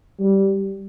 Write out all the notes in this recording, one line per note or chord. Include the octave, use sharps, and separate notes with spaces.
G3